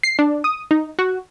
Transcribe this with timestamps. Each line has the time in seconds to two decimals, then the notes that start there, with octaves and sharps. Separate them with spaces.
0.03 C7
0.19 D4
0.44 D#6
0.71 D#4
0.99 F#4